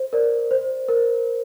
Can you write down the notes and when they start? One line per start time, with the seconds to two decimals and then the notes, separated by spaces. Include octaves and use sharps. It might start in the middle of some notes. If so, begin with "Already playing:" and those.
Already playing: C5
0.13 A#4 D5
0.51 C5
0.89 A#4